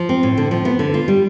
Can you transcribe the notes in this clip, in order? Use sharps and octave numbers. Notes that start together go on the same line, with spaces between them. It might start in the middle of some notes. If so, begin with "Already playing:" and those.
Already playing: F3
C4
A2
D3
F3
B3
D3
F4
G3